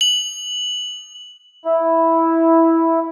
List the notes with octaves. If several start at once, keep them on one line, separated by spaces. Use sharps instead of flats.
F#7
E4